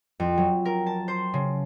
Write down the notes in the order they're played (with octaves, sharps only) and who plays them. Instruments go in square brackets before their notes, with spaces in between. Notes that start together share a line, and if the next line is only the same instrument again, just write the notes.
[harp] F2
F#3
A#4
A5
C5
C#3